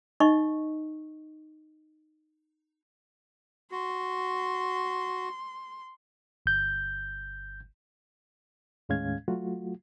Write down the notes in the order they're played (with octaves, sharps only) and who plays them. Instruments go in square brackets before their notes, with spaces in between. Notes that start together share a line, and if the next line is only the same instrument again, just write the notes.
[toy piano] D#4 D#5 C#6
[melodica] F#4 [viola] C6
[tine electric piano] G1 G6
[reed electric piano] D#2 A2 G#3 C#4 F5 G#6
F#3 A3 F4 F#4